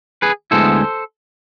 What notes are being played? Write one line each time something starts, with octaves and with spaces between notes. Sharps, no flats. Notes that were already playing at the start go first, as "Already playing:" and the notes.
G#4 B4
D2 D3 G#3 B3 E4 A4 C5